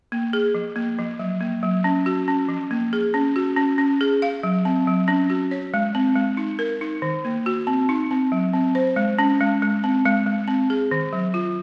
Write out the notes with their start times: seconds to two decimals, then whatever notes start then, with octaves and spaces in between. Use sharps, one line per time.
0.12 A#3
0.33 G#4
0.55 F3
0.76 A#3
0.98 F3
1.19 F#3
1.40 A#3
1.63 F#3
1.84 C#4
2.06 F#4
2.28 C#4
2.49 F3
2.71 A#3
2.93 G#4
3.14 C#4
3.36 F#4
3.56 C#4
3.78 C#4
4.01 G#4
4.22 F5
4.43 F#3
4.65 C4
4.87 F#3
5.08 C#4
5.30 F#4
5.51 C#5
5.74 G#3
5.95 C4
6.16 G#3
6.37 D#4
6.59 A#4
6.81 D#4
7.02 D#3
7.25 A#3
7.46 F#4
7.67 C4
7.89 D#4
8.11 C4
8.32 F#3
8.53 C4
8.75 C5
8.96 G#3
9.19 C#4
9.41 G#3
9.62 G#3
9.84 C4
10.05 G#3
10.26 G#3
10.48 C4
10.70 G#4
10.91 D#3
11.13 F#3
11.34 F4